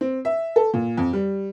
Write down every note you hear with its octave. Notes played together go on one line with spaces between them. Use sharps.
C4
E5
A4
A#2
F2
G3